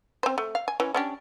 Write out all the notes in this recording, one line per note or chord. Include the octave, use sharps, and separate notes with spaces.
C4 C5
A3
F5
G#5
E3 C#4
C#4 D4 G4